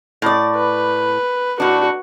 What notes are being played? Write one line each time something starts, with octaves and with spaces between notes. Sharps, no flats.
A2 D5
B4
A2 D4 F#4